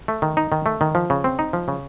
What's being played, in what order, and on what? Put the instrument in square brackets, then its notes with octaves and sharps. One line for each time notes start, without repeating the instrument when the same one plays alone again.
[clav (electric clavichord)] A3
D#3
D#4
D#3
A3
D#3
F3
C#3
C4
D#4
F3
C#3